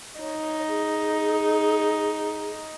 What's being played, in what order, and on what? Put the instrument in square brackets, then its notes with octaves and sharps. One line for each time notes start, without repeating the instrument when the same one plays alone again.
[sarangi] D#4 [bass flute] C#5
[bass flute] G#4